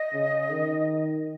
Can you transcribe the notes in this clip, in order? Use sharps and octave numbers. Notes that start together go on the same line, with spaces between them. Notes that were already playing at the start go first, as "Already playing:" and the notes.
Already playing: D#5
C#3
D#3